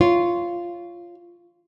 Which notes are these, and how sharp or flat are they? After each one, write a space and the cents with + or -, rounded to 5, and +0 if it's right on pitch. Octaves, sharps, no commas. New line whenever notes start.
F4 -10 C#5 +5